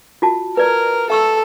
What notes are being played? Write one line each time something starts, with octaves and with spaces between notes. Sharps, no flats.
F4 F#4 A5
A#4 B4 D5
A4 E5 C#6 E6